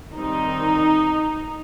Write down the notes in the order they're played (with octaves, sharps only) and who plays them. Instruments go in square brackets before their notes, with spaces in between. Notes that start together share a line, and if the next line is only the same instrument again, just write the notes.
[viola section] D#3 G3 C4 D#4